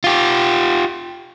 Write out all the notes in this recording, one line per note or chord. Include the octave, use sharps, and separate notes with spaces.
F4 G4